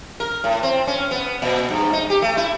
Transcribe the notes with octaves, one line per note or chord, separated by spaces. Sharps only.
A#4
A2
C4
C#4
B3
A#2
G2
D#4
G4
A3
E4